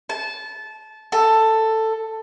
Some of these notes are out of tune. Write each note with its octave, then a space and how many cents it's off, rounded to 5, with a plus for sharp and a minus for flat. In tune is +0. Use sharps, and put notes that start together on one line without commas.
A5 -20
A4 +10